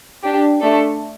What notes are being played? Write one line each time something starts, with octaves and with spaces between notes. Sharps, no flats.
D4 G4
A3 D4 A4